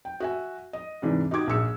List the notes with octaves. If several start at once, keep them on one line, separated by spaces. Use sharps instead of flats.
G5
F#4 E5 G#5
D#5
G#2 C3 E3 D4
D#4 F#4 G4 D6 G#6
A#1 G#4 E6 C#7